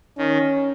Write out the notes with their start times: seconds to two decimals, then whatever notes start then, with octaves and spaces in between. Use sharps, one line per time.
0.17 D#3 C#4